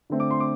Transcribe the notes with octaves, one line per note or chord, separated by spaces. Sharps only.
D3 A3 C4
D6
C6
D6